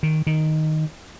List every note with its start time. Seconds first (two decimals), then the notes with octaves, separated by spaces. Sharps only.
0.03 D#3
0.27 D#3